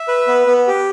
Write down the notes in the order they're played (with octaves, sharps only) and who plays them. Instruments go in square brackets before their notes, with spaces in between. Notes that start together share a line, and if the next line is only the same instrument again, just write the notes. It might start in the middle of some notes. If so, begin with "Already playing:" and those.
Already playing: [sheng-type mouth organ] E5
B4
B3
B3
G4